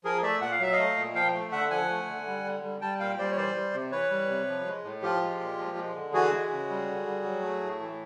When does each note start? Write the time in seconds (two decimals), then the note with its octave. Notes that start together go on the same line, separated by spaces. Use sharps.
0.04 F3 G#4 A#4
0.23 A3 D5 E5
0.41 A#2 F#5
0.51 F5
0.60 F#3 E5
0.72 D#5 F5
0.79 A3
0.97 A#2
1.15 F3 F5 G5
1.34 A3
1.52 D3 E5 F#5
1.70 F3 F#5 G#5
1.90 A3
2.07 D3
2.27 G3
2.44 D3
2.63 G3
2.81 G3 G5 A5
3.00 A#2 F5 G5
3.18 G3 C5 D5
3.32 C#5
3.37 E3 C5 D5
3.56 G3
3.74 C3
3.91 E3 B4 C#5
4.10 G3
4.29 C3
4.48 F3
4.65 G#3
4.84 A2
5.02 F3 F4 G4
5.22 G#3
5.40 A#2
5.58 F3
5.77 G#3
5.95 D3
6.13 E3 F#4 G#4
6.32 G#3
6.50 C#3
6.69 G3
6.87 D3
7.06 G3
7.24 F#3
7.42 A3
7.61 A2
7.80 E3